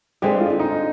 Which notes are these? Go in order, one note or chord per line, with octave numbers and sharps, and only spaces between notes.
G2 D3 G#3 C4 G4
F4
D#4